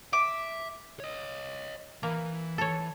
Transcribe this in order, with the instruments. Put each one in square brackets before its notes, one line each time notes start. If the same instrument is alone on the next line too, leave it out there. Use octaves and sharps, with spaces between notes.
[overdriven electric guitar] E5 [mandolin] D6
[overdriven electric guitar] C#5 D#5
[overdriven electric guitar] E3 [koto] A#3
[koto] A4 C#5